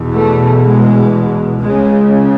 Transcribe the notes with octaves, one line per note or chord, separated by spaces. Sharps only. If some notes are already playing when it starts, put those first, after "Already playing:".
Already playing: E2 B2
A3
G#3
C#2 C#3 G#3